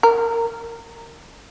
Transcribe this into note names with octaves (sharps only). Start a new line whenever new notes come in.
A#4